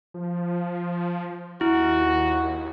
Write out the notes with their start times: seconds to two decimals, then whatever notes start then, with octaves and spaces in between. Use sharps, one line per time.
0.14 F3
1.61 D#2 E4 F#4